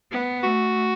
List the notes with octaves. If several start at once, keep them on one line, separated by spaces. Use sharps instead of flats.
B3
A3 F#4